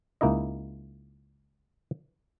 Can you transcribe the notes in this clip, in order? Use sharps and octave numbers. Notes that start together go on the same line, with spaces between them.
C#2 A#3 D#4 E4 D#5